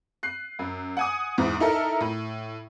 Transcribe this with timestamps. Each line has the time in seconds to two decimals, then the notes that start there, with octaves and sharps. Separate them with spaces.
0.23 F#6 C7
0.59 F#2
0.97 F#5 G#5 D#6
1.38 E2 G#2 E3
1.60 D#4 E4 A4 A#4
2.01 A2